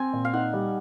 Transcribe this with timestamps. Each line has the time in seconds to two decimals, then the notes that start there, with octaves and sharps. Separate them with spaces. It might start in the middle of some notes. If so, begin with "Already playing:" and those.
Already playing: C4 G#5
0.13 A#2
0.25 F5
0.33 D#4 F#5
0.53 G3